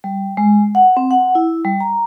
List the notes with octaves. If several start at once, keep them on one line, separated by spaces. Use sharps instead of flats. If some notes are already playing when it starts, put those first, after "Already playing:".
G3
G#3
F#5
C4
F#5
E4
G3
A#5